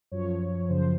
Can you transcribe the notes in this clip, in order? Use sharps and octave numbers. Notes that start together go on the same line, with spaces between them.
F#2 F3 C#5
F#2 C#3 F3 C5